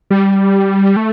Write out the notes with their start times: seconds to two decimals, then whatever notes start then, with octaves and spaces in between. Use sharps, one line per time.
0.10 G3
0.96 A3